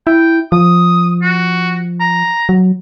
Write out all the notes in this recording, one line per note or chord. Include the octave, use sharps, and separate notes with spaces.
E4 G5
F3 D#6
F#4
A#5
F#3